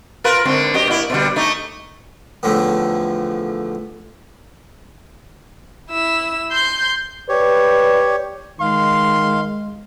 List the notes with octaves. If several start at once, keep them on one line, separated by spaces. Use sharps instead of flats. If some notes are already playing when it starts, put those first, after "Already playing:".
F4 A#4 B4
G#2 D3 C4
F#2 G4 D#5
A#2 E4
B2 D3 G3
A3 D#4
E2 A2 D3 F3 A3
E4 E6
C6 G6
G4 B4 C#5 D5
D#3 G#3 F5 C6